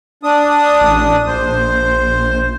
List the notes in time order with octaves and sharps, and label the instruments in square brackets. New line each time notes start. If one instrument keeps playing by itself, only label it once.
[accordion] D4 D#6
[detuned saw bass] A1
[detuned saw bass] A#1 [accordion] C5